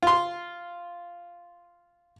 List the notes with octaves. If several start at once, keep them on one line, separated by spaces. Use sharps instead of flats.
F4 C6